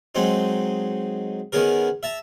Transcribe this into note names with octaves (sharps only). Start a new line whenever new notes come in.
F#3 G#3 C4 D#4
D#3 B3 C#4 G#4 A#4
E5 A5 A#5